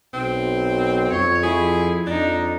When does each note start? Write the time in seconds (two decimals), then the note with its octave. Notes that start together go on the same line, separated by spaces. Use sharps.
0.14 B1 C4
1.11 F2 C#5
1.43 F3 E4 G#4
2.07 F2 D4 D#4